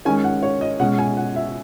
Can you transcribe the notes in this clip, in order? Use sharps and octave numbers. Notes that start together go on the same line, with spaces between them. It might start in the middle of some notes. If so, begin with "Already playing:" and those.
D#3 G#3 C#4 G#5
F#5
C#5
D#5
B2 G#3 C#4 F#5
G#5
F#5
E5